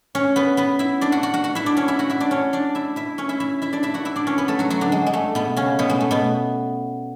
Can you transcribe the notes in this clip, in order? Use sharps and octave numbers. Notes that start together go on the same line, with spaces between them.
C#4 C#5
B3 B4
B3 B4
E4 E5
D4 D5
F#4 F#5
F#4 F#5
F#4 F#5
F#4 F#5
E4 E5
D4 D5
C#4 C#5
E4 E5
F#4 F#5
E4 E5
D4 D5
C#4 C#5
D4 D5
E4 E5
E4 E5
C#4 C#5
E4 E5
E4 E5
E4 E5
D4 D5
E4 E5
F#4 F#5
E4 E5
D4 D5
C#4 C#5
B3 B4
A3 A4
F#3 F#4
F#3 F#4
D3 D4
G#3
G#3
A3
B2 B3
C#3 C#4
B2 B3
G#3
A3
B2 B3